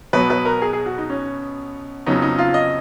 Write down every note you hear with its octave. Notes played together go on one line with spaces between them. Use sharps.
B2 F#3 B3 B4
B4
A#4
G#4
G#4
F#4
D#4
C#4
F2 C#3 F#3 B3 D#4
D#4
F4
D#5